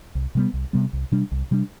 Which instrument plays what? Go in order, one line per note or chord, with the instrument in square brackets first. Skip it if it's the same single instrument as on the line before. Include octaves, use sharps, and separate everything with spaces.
[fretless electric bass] C2
C3 G3 B3
C2
C3 G3 B3
C2
C3 G3 D4
C2
C3 G3 D4